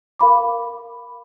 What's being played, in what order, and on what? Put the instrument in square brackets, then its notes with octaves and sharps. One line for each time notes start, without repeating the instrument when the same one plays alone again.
[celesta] A#4 F5 B5 D6